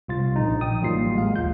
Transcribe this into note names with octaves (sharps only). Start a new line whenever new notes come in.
C2 F4 A6
A#1 D#4
G5 D#6
A1 F#3 G3 A#3 F4 C7
G#3 F5
G1 D2 F4 G6